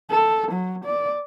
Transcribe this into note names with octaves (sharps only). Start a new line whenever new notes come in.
A4
F#3
D5